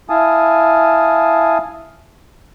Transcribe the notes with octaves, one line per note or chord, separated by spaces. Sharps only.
E4 F5 G#5 A5 D#6